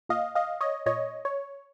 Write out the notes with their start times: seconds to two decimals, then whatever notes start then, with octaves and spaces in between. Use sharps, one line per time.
0.09 A#2 D#5 F5
0.35 D#5 F5
0.61 C#5 D#5
0.86 A#2 C#5 D#5
1.25 C#5